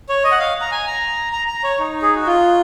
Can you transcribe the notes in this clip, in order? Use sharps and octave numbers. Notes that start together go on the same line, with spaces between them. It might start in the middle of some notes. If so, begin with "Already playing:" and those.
C#5
D#5
F#5
F5
A#5
G#5
A#5
A#5
A#5
C#5
D#4
G#4
F#4
F4